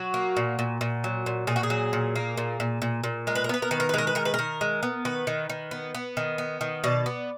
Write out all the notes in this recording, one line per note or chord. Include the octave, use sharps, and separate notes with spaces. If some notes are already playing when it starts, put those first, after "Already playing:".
Already playing: F#3 F#4
A#3
A#2
A#2
A#2
F#3
A#2
A#2 G#4
F#4
G#4
F#3
A#2
A#3
A#2
A#2
A#2
A#2
G#3 A#4
B4
A#4
B3 B4
A#4
D#3 B4
A#4
B4
G#3 A#4
B4
D#3 A#4
B4
D#3 A#4
G#3
B3
D#3 B4
D#3
D#3
B3
B3
D#3
B3
D#3
B2 D5
B3